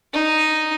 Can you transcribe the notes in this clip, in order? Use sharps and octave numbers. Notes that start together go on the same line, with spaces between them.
D#4